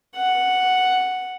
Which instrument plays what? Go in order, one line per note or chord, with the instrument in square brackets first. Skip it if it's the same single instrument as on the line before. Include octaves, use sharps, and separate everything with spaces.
[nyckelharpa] F#5